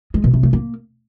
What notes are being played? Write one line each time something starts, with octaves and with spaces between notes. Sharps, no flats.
G#3
B2
C3
A3
A#3